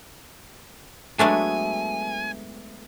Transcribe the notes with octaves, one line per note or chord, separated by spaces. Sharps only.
F#3 G#3 A3 B3 D4 G#5